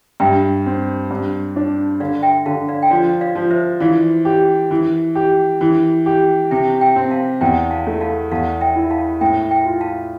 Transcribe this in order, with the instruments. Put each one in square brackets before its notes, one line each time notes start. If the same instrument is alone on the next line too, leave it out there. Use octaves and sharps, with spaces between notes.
[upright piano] G2 [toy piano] E5 G5
[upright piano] C4
G2
D4
[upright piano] D3 [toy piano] D5 F5
[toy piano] E5 G5
[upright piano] D3 [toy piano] F5 A5
[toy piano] D5 F5
G5
[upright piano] F3 [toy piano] D5 F5
[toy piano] D5 F5
[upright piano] F3
[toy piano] C5 E5
[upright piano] E3 [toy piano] D5 F5
[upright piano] G4
E3
G4
E3
G4
[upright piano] C3 [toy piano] E5 G5
[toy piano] E5 G5
[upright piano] C4
[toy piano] F5 A5
[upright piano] E2 [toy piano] E5 G5
[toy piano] F5 A5
[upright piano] A3
[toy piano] F5 A5
[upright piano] E2 [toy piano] F5 A5
[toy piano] E5 G5
[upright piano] E4
[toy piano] F5 A5
[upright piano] A2 [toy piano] E5 G5
[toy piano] E5 G5
[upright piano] F4
[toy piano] F5 A5